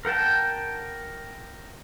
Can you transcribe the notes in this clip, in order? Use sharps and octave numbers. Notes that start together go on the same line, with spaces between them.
A#4 F#5 G5 A5